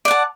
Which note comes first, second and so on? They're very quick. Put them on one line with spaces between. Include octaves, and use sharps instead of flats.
D5 F#5 A5